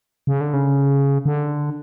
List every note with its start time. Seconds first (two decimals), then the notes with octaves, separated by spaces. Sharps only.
0.27 C#3
0.41 D3
0.54 C#3
1.26 D3